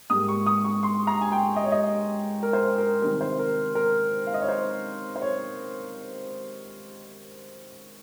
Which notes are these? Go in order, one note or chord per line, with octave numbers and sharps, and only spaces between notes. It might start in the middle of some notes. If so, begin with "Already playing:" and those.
G#2 G3 A#3 D#6
C#6
D#6
C#6
C6
A#5
G#5
G5
D#5
C#5
D#5
A#4
C5
A#4
C3 D#3 G3 A#4
C5
A#4
A#4
F5
D#5
C#5
C5
C5
C#5